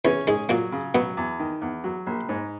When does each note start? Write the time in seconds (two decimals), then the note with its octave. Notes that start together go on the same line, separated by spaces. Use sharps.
0.05 E2 E3 C#4
0.27 G#2 G#3 G#4
0.49 A#2 F#3 A#3
0.72 C#3
0.94 B2 F#3 B3
1.17 E2
1.39 D#3
1.61 E2
1.84 F#3
2.06 A#1
2.29 G#2